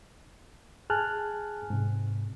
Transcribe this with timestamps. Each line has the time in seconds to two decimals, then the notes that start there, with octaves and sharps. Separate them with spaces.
0.90 G#4 G#5 A5 F6 F#6
1.70 G#2 C3